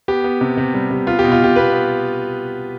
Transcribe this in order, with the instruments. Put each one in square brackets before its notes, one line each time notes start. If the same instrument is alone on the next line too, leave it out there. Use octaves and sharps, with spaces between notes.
[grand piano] B3 G4
B3
C3
C3
G3
C3
B3 F4
G4
B2
F4
B2 G4
B2 B4
B3